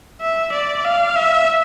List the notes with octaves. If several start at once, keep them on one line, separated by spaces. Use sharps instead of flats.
E5
D5
F5
E5